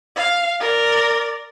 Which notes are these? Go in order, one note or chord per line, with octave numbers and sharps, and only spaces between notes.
F5
A#4 D5